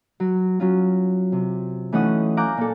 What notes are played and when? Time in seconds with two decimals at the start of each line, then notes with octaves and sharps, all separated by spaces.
0.20 F#3
0.60 F#3 C#4 F4
1.32 C3
1.92 E3 A3 C#4 D#4 F#5 D#6
2.37 F5 G#5 A#5 D6 F#6 G6
2.57 A#2 A4